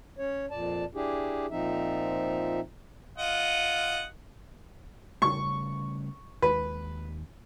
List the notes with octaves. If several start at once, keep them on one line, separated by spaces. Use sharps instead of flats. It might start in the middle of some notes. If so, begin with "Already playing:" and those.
C#4 C#5
F2 A#2 D5 A5
D4 E4 G4 G#4
A#2 F3 C4 D#4 E5
F4 D#5 F#5
C#3 G3 A3 C#6
D#2 G#3 B4